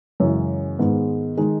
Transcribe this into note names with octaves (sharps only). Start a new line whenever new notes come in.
F#2 C#3 E3 G#3 C#4
G#2 D#3 G#3 B3
D#3 G#3 D#4